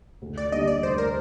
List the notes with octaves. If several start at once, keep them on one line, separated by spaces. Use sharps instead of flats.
D2
D5
D3 G3 A#3 D4 D#5
D5
D2 C5
A#4